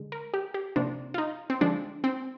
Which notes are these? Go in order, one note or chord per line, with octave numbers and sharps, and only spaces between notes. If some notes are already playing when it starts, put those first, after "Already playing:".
Already playing: D3 G#3
A#4
G4
G4
C3 F3 A#3 D4
F4
D#4
C4
D3 F3 G#3 D4
C4